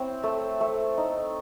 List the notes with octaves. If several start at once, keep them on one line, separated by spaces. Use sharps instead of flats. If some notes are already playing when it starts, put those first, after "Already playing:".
Already playing: C4 E4 C#5
A3
A3
D#4